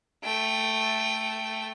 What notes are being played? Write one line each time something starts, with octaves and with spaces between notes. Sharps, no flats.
A3 G5